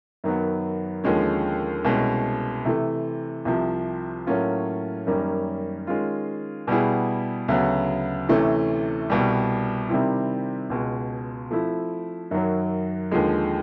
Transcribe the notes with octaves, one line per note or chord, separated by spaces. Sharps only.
F#2 D#3 F#3 B3
D#2 D3 F3 G#3 C#4
C2 B2 G#3 C#4
C3 E3 A3
C2 C3 F3
A2 F#3 A#3 C#4 F4
F#2 D#3 G3 A#3 C#4
D#3 G#3 C#4 F4
B2 G3 B3 E4 G#4
D2 C#3 F#3 B3
D2 C3 E3 A3 C#4
C2 B2 G3
C3 D#3 G3 C4 E4
C#2 B2 G#3
F3 A3 C4 E4
F#2 D#3 F#3
D#2 D3 F3 G#3